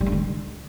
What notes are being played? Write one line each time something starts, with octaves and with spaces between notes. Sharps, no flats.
G3
D4
D#3
G#3